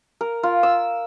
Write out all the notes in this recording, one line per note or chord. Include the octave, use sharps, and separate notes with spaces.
A#4
F4
E6